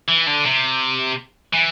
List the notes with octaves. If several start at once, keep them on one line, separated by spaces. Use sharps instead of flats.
E3
D3
C3
E3